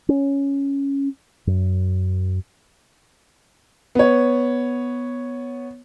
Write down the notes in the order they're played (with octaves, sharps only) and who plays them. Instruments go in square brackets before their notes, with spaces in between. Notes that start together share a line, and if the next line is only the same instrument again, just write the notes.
[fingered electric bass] C#4
F#2
[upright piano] B3 C#5